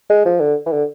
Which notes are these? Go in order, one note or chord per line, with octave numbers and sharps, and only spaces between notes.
G#3
F3
D3
E3
D3